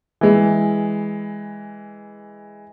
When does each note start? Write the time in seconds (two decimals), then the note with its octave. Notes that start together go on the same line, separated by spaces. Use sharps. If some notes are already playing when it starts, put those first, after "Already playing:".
0.21 E3 G#3